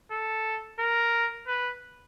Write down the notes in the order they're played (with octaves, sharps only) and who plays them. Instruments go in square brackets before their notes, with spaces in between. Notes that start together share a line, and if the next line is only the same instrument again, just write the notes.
[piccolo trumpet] A4
A#4
B4